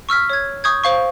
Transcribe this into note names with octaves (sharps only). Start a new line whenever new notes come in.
C#6 E6 F6 B6
C#5 G#6
C#6 D#6 G6 G#6
C5 F5 C#6